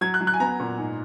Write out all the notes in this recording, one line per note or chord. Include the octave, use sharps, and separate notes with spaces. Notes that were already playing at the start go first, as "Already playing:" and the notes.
F#3 G#6
F#6
F#3
F#6
G#5
B3 A#5
A#2
G#2